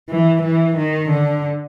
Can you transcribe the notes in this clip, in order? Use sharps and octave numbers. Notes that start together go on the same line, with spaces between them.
E3
E3
D#3
D3